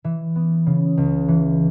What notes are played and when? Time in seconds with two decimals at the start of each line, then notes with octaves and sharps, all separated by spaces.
0.04 E3 E5
0.36 B3
0.66 C#3
0.97 C#2
1.28 E3